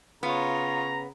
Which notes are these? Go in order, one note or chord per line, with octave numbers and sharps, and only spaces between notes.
C#3 B3 F4 C#5 A#5